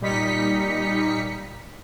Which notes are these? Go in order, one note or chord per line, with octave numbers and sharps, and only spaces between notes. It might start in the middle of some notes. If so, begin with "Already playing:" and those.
A#2 G3 D#4 B6 C#7